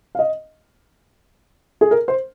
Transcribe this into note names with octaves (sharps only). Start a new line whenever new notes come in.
F5
D#5
G#4
A#4
C5